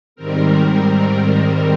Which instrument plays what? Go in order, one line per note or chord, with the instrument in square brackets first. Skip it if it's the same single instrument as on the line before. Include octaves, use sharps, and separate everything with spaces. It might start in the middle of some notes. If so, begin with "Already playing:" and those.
[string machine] G#2 D#3 G3 C4 A#4